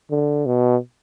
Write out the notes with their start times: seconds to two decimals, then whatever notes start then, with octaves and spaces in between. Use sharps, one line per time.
0.11 D3
0.46 B2